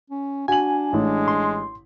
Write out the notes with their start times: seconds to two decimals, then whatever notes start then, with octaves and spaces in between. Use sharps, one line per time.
0.10 C#4
0.48 D4 F#4 G#5 F#7
0.93 A1 G#3
1.28 C6